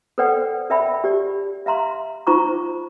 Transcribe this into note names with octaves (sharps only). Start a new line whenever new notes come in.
A4 B4 C5 D5 F#5 G5
A#4 D5 E5 G5 A5 B5
G4 D5
E5 F5 A#5 C6
D#4 F4 C5 A#5 C#6 D6